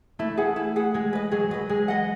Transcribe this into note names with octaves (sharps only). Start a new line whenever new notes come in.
A3 E4
G#4 B4 F#5
E4
G#4 B4 F#5
G#3 G#4
B4 D#5
F#3 G#4
F#3 B4 D#5
G#3 G#4
B4 D#5 F#5